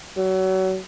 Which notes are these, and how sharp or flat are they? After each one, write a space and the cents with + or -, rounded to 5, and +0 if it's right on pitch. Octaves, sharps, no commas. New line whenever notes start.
F#3 +30